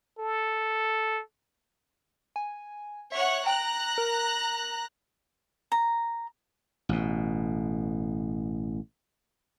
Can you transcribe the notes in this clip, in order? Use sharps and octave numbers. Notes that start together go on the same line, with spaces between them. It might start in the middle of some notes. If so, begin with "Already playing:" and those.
A4
G#5
C#5 E5 F#5
G5 A#5 F#6
A#4
A#5
A1 B2